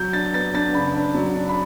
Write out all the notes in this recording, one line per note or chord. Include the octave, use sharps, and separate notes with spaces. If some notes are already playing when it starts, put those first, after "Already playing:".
Already playing: F#3 G6
D4 A6
B3 A6
D4 A6
C#3 B5
D4
F#3
D4
B5